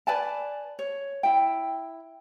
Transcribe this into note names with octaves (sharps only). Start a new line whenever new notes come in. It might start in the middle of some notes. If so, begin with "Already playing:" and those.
B4 D5 G#5 A5
C#5
E4 G5